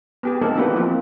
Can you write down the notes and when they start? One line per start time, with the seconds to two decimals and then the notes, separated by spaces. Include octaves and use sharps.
0.23 B3 G4 G#4
0.42 A3 A#3 C4 D#4 A4 A#4
0.55 E3 B3 D4 F#4 G4 B4
0.76 E3 F3 A#3 C4